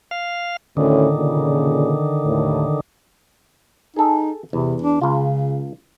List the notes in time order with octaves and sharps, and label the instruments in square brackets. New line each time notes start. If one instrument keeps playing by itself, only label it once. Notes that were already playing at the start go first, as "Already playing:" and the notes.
[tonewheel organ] F5
[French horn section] D2 A2 C#4 [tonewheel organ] D3 D#3
[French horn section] A#2 C#3
D#2 A2
[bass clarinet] D#4 [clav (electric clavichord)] G#4 A4
[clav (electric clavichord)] E2 [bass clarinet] C3
[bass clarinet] D4
[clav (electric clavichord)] C#2 F4 [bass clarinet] C#3